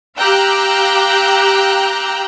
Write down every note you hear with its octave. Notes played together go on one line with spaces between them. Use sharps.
G4 F5 G5 A#5 E6 F#6